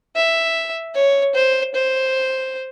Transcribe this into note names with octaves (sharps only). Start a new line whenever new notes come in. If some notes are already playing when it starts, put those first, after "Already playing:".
E5
C#5
C5
C5